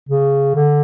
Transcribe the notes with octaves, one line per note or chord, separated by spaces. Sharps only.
C#3
D3